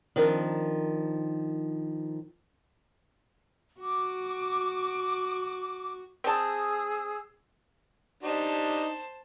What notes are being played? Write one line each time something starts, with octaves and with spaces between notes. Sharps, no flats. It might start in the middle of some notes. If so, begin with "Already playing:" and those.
D#3 F3 C4 D4 A#4
F#4 D6
C4 G#4 A5 D#6 E6
D4 D#4 G4 C5 A5